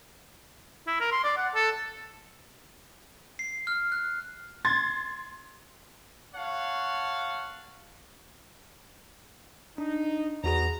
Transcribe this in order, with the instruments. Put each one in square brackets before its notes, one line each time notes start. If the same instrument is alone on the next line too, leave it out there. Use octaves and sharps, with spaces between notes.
[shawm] E4
A#4
C6
D5
F#5
A4
[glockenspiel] C7
F6
F#6
[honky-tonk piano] C6 G#6 A6
[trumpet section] C#5 F5 F#5 A5
[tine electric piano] D4 [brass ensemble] D#4
[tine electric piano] E2 F#4 G#4 [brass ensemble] B3 A#5